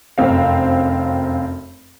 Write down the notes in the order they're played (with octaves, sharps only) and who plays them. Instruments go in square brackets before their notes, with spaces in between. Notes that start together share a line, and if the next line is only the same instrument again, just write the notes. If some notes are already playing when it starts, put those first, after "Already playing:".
[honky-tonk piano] F1 F#2 C4 F5